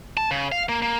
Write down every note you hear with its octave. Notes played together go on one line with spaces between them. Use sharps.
A5
C#3
F5
A#3
A#3